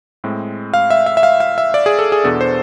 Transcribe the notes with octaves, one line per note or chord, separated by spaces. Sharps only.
A2 G#3 C4
F5
E5
E5
E5
F5
F5
E5
D5
G#4
A4
G#4
E2 B2 B3 D4 A4
C5